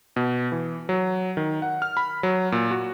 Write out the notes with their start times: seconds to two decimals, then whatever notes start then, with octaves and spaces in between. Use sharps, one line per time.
0.16 B2
0.52 E3
0.89 F#3
1.37 D#3
1.62 F#5
1.82 F6
1.97 B5
2.23 F#3
2.52 A#2
2.71 F#4